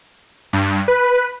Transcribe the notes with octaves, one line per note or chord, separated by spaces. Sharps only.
G2
B4